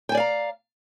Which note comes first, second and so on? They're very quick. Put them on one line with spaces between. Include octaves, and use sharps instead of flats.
G5 G#5 D5 F5 A#5